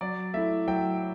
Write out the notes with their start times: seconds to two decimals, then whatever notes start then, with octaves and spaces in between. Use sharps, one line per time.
0.01 F#3 D5
0.34 A3 E4 E5
0.67 F#3 G5